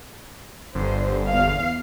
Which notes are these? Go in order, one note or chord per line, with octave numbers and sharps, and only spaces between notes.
G1 D3 C5
E2 F5